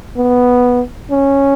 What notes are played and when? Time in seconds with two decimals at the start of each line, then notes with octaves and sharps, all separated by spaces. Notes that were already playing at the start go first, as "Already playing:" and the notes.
0.17 B3
1.11 C#4